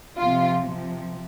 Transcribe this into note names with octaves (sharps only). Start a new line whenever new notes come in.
C3 F3 F4
C3 F3